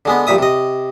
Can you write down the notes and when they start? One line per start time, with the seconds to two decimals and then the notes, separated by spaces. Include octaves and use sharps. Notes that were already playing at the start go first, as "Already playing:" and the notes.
0.05 D3 G#3 B3
0.27 A#1 G2 A#2 E5 D#6
0.38 C3 D#5